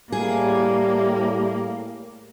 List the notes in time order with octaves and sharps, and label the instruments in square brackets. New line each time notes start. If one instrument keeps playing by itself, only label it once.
[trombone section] A2 G3 [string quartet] A#3 [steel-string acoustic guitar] G#4